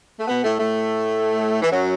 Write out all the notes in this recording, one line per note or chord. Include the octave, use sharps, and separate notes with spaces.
A3
B2 B3
A2 A3
A2 A3
E3
F#2 F#3